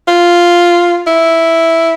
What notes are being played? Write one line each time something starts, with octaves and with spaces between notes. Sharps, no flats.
F4
E4